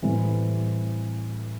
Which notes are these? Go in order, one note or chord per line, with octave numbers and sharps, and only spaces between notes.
A2 E3 G3 C4